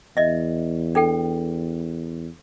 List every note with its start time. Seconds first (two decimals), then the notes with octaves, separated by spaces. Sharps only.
0.17 E2 D#5 E5
0.95 D4 A4 G5